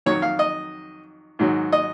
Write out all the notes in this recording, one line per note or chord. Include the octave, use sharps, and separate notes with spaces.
F2 D#3 F#3 C#5
F5
D#5
G#2 D#3 F#3
D#5